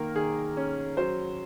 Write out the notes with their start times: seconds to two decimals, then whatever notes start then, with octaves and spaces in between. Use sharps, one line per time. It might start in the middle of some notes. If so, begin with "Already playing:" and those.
Already playing: D#3 A#3 A#4
0.15 D#3 G#4
0.57 C#4
0.97 F#3 C5